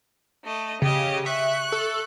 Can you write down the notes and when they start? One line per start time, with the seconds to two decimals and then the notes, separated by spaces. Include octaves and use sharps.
0.44 A3 D#5
0.82 C#3 G4 D#5
1.26 E5 C#6 F#6
1.72 A4